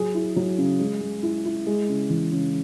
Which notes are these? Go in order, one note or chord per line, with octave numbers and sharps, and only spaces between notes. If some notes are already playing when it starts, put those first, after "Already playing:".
Already playing: F#3 G#4
E4
F#3
C#3
G#3
G#3
E4
E4
G#3
C#3
E3
C#3